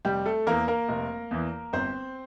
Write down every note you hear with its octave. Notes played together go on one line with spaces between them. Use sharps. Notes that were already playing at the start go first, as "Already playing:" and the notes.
F1 G3 G4
A3 A4
E2 E3 A#3 A#4
A#3 A#4
F1
E2 E3
G1 C4 C5